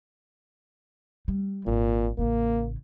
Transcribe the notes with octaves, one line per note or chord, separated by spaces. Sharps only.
G3
G#1 A#2
A1 C#3 A#3